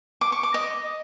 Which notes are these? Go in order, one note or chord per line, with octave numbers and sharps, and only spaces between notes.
D6
C#6
D6
D#5